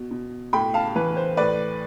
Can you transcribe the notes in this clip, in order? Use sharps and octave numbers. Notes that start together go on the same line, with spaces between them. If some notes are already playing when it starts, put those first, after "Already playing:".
Already playing: B2
B2
A2 G5 B5
F5 A5
E3 B4
C5
A2 B4 D5